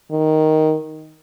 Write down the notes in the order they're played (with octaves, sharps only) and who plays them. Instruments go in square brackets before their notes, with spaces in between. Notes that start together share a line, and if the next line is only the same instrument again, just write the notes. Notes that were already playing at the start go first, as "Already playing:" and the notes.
[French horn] D#3